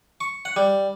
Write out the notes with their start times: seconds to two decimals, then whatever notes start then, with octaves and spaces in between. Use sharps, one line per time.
0.21 C#6
0.45 F#5
0.56 G3